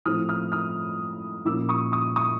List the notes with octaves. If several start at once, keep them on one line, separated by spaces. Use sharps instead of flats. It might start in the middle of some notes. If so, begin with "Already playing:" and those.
A2 F3 A3 C4 E4 D#6 F6
D#6 F6
D#6 F6
A#2 F3 A#3 C#4 E4 D6 E6
C#6 D#6
C#6 D#6
C#6 D#6